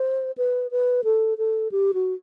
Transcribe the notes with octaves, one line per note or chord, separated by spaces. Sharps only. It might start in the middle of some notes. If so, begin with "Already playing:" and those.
Already playing: C5
B4
B4
A4
A4
G4
F#4